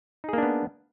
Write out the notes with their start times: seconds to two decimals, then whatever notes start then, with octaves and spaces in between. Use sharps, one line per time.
0.24 D#4
0.29 G#4
0.33 A#3
0.38 D4
0.43 B3